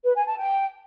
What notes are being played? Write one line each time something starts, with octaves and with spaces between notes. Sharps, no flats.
B4
G#5
A5
G5